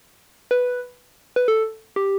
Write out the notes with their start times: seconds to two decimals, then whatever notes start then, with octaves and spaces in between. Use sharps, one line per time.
0.51 B4
1.36 B4
1.48 A4
1.96 G4